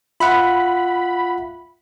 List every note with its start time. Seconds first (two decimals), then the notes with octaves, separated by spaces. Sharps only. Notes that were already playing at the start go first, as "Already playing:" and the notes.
0.20 F4 E5 F#5 B5